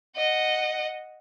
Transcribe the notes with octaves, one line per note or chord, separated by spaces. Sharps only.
D#5 F#5